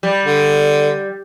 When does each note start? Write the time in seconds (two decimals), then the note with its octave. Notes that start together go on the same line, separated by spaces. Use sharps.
0.03 G3
0.26 D3